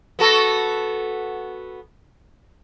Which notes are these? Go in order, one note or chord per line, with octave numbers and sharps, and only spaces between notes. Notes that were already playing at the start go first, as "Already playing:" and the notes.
B3 F#4 A4